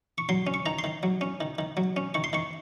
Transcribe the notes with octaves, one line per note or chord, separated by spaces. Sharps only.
C#6
F#3 C6
C#4
C#6
D#3 A#5
C6
D#3
F#3
C#4
D#3
D#3
F#3
C#4
D#3 C#6
C6
D#3 C#6